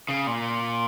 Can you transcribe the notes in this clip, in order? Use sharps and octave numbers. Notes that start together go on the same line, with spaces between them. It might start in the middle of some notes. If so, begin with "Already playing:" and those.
C#3
A#2